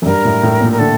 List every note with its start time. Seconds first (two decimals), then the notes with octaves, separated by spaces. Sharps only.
0.02 F#2
0.06 G2 A#4
0.25 A2
0.43 A2
0.61 A#2
0.72 A#4
0.79 D3 A4